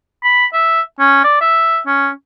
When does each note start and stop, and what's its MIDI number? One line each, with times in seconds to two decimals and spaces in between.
0.24 0.46 83
0.53 0.81 76
0.99 1.22 61
1.24 1.41 74
1.41 1.79 76
1.87 2.10 61